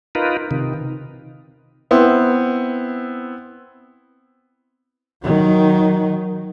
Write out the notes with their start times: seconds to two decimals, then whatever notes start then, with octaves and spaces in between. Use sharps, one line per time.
0.15 D#4 F4 A#4 B4
0.51 C3 D#3
1.91 B3 C4 E4
5.23 D#3 F#3